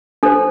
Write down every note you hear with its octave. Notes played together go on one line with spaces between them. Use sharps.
D4 A4 C5